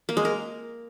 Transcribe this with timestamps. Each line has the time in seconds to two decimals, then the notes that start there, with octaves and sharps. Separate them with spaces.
0.09 A#3
0.17 G#3
0.25 A#4